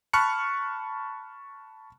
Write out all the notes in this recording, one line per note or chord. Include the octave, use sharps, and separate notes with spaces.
A5 B5 C#6 F6 F#6 C#7